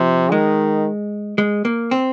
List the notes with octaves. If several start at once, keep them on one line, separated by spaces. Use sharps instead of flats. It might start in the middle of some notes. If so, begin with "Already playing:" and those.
Already playing: C3 F3
D#3 G#3
G#3
A#3
C4